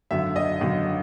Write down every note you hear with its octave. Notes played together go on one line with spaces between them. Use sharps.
G#1 F#2 D3 E5
D#5
G#1 F#2 D3